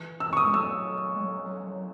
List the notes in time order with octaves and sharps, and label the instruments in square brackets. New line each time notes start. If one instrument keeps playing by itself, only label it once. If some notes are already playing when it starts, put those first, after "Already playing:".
Already playing: [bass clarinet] E3
[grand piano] E6
C#6
D#6
[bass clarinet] G#3
[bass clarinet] F#3 [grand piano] E6
[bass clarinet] G#3
F#3
F#3
F#3